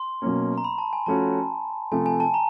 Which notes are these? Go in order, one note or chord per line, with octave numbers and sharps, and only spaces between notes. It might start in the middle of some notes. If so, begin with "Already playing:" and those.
Already playing: C6
B2 F#3 A#3 C#4
A#5
B5
A5
G#5
F3 A3 C#4 F#4 A5
C3 F3 A3 G#5
G#5
A5
A#5